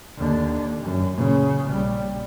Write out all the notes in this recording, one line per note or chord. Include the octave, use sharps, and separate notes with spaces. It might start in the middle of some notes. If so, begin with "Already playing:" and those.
D#2 D3
F#2
A#2 C#3
A#1 G3